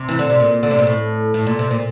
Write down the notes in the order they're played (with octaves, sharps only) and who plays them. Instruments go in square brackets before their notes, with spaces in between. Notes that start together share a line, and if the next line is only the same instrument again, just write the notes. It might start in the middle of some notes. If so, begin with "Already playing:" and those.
Already playing: [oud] C3
E3
D3
C3
A#2
D3
C3
A#2
A2
A2
A#2
C3
A#2